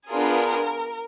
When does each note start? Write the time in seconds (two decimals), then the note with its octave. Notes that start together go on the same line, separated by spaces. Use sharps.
0.10 B3 D4 F4 G#4 A#4